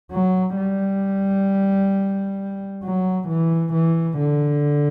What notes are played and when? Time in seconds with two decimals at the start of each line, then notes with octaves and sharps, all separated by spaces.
0.12 F#3
0.57 G3
2.83 F#3
3.29 E3
3.74 E3
4.19 D3